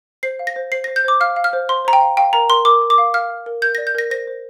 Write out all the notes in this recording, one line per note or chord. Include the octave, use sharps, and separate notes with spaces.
C5 C7
F5
A#6
C5
C5 C7
C5 A#6
G6
C5 D6
F5 F6
F5
F6
C5
C5 C6
C5 A#5
G5
F5
F5 G5
A#4 A#5
A#4 C6
A#4 D6
A#4
D6
F5
F5 F6
F5
A#4
A#4 G6
D5 A#6
G6
A#4 A#6
C5 A#6
C5